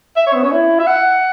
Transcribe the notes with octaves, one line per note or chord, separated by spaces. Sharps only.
E5
C#5
B3
C#4
E4
E5
F#5